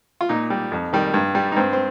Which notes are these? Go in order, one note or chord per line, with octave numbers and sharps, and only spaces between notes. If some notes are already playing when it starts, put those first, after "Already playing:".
F4
A#2 D#4
G3
F2
D#3 G3
G2
G3
D#4
G2 C4
C4